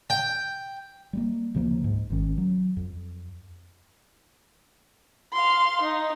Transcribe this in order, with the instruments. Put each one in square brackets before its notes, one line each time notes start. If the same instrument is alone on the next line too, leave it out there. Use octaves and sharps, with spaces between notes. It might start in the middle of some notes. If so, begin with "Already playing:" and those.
[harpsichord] G5
[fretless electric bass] G3 G#3 A#3
D2 C#3 F3 A#3
C#2 G#2
G#1 D#3 C#4
F#3
F2
[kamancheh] F5 C6
D#4